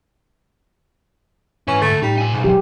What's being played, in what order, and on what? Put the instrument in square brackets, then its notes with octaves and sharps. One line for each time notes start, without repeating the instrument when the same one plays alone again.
[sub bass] G#2 [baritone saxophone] C#4 [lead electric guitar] E4 B4
[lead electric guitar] D2 [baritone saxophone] A3
[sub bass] A2 [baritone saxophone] G3 [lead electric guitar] D#4
[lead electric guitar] F4 G#5
[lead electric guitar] B1 [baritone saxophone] G#2
[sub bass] F1 [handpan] F#3 G4